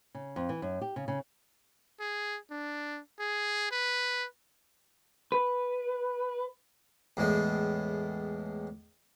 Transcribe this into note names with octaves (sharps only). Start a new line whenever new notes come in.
C#3
F2
E3
F#2
G4
C#3
C#3
G#4
D4
G#4
B4
B4
E2 A2 G#3